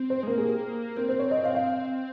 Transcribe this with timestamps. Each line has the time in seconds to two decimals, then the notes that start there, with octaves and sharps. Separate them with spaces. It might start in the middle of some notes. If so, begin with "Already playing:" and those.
Already playing: C4
0.10 C5
0.23 G#3
0.27 A#3 A#4
0.38 G#4
0.45 G4
0.97 C4 A#4
1.09 C5
1.19 C#5
1.31 D#5
1.43 F5
1.54 F5